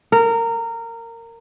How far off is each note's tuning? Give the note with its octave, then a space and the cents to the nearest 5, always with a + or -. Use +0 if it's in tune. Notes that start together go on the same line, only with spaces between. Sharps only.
A#4 -20